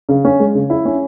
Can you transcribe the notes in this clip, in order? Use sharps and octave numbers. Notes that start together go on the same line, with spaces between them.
C#3
C#4
G#3
C#3
E4
C#4